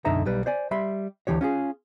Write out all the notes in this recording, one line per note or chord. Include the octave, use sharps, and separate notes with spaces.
B1 F#2 D3 D#4 E5 A#5
B1 G3 B4
C5 D5 G#5
G3 E5 B5 C6
D2 E3 G4 C#5
C#4 F4 G4 G#4